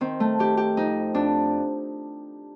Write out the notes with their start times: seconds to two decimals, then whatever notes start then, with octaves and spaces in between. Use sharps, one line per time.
0.01 D#3 C4
0.20 A3
0.39 D#3 G4
0.57 G4
0.77 F2 D#4
1.14 F2 D4